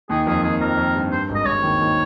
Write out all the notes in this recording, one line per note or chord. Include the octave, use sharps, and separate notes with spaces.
D#2 D#3 G#4
F2 F3 G#4
D#2 D#3 G#4
F2 A#4
F2
G2
G2 C5
G#1 G#2
D#5
G#1 G#2 C#5
D#2 D#3
D#2 D#3